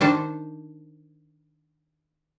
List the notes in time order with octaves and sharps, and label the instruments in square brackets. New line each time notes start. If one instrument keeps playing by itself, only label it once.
[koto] D#3 D4 C5